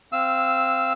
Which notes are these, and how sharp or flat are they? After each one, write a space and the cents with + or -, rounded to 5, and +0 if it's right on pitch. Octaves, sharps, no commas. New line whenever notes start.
C4 -5 F5 -20 E6 -5